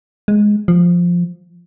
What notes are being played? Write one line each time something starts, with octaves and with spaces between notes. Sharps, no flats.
G#3
F3